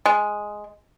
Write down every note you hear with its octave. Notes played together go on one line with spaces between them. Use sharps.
G#3